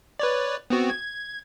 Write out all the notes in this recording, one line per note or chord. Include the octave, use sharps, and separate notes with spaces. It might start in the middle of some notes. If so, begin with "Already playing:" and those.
B4 C#5 D5
B3 C4 F#4
G#6